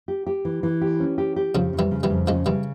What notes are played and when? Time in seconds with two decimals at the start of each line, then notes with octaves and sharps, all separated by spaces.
0.08 G4
0.26 G4
0.45 E3
0.63 E3
0.81 G4
1.00 C#4
1.18 G4
1.36 G4
1.55 F2 C#3 F3
1.73 F2
1.79 E3 G3
1.91 C#3
2.03 E3 G3
2.10 F2
2.27 C#3 F3 G#3
2.46 C#3 E3 G3